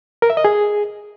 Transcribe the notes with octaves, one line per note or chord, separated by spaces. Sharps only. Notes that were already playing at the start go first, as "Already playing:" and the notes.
A#4
E5
D#5
G#4